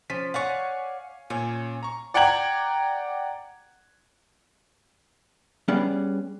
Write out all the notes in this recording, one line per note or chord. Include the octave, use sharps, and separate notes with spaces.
F3 C#4 B6
C#5 D5 F5 F#5 G#5 C#6
A#2 C#4 C#5
A#5 C#6
D5 F#5 G5 A#5 G#6 F#7
G3 B3 C#4 G#4 D5